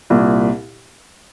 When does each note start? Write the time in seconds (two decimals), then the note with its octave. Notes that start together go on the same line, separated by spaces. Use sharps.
0.10 C2 A#2